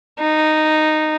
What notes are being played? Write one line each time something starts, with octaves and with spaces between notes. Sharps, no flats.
D#4